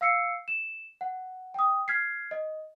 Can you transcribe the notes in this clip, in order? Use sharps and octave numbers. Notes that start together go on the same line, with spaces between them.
F5 E6 C7 C#7
E7
F#5
G5 D#6
F6 G#6 B6 C7
D#5